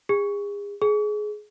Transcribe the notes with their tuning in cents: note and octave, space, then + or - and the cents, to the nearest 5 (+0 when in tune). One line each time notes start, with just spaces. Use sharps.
G#4 -35
G#4 +20